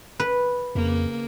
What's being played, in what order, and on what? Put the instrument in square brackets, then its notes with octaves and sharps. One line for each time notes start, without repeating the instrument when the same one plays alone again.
[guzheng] B4
[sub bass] F2 [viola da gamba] C#3 A#3